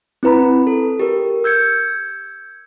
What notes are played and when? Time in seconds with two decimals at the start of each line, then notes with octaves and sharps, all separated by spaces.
0.23 C4 E4 B4 A#5 B5
0.67 A4
1.00 G4 A#4
1.44 E6 G6 G#6 C#7